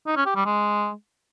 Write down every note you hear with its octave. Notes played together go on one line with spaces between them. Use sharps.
D#4
C#4
G4
G3
G#3